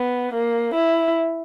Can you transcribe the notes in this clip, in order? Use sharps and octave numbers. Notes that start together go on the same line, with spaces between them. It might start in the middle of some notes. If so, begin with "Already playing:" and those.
Already playing: B3
A#3
E4